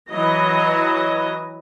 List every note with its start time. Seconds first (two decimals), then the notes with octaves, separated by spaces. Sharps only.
0.12 E3 F#3 D#5